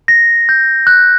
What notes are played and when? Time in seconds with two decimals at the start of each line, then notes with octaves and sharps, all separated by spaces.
0.08 A#6
0.49 G6
0.87 F#6